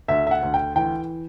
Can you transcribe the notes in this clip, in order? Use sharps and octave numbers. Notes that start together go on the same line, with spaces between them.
D2 E5
E5
F#5
D2
G5
E3 G5